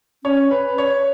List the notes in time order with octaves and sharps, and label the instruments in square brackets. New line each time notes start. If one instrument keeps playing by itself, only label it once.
[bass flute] C#4 [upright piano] C#5
[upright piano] B4
C#5